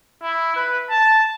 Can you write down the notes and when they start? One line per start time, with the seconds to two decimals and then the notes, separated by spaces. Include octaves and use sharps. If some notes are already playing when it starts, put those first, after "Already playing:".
0.22 E4
0.56 B4
0.91 A5